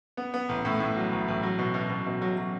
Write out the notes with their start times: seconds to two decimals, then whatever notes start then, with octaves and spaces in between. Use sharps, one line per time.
0.17 B3
0.34 B3
0.49 A1
0.65 A2
0.80 A2
0.96 F#3
1.12 A1
1.28 A1
1.43 F#3
1.59 B2
1.74 B2
1.90 B2
2.06 B2
2.22 F#3
2.37 F#3